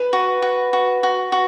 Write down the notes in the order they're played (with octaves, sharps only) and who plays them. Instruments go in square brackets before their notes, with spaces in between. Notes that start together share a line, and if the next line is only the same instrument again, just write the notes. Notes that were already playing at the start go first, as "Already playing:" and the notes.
Already playing: [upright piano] B4
[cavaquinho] F#4
F#4
F#4
F#4
F#4